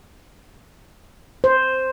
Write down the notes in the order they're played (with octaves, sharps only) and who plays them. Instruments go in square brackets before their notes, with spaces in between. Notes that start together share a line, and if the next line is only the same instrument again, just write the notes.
[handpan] C5